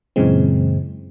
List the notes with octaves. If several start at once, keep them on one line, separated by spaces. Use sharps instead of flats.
F#2 A#2 C#3 E3 G#3 C4